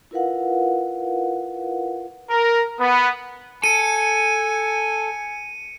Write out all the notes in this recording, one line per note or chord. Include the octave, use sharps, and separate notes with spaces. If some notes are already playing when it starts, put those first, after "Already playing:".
E4 F4 A#4 B4 F5 F#5
A#4
B3
A4 G#5 C#7 D#7